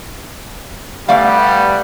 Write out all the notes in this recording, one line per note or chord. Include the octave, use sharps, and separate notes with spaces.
G3 A3 B3 D5 F5